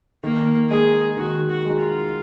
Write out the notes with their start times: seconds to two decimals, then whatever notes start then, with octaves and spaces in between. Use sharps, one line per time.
0.24 D#3 A#3
0.70 G#3 D#4 G#4
1.17 D#3 F#4
1.49 F#4
1.65 G#3 D#4
1.81 F4